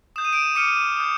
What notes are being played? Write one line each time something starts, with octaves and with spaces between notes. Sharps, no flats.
D#6 G6 E7
D#7
D7 E7
D6 F6 C#7 D#7
D#6 G6